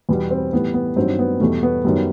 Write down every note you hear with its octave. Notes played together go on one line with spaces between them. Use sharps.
E2 B2 G3 B3
C4
A2 E3 G3 B3
B3
G2 D#3 F#3 C4
B3
E2 B2 G3 A3
B3
F#2 D#3 G3 B3